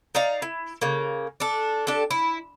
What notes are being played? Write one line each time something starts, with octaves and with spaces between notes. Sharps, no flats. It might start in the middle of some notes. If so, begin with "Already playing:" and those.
D#4 D5 F5 A#5
E4
C#3 A#3
D4 A4
D4 G4 A4
E4